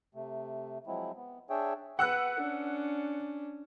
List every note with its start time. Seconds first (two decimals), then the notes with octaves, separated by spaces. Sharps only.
0.15 C3 A3
0.87 F3 F#3 G#3 C4 E4
1.17 B3
1.50 D4 G#4 C#5 E5 G5
1.99 B4 F#5 E6 F#6
2.38 C#4 D4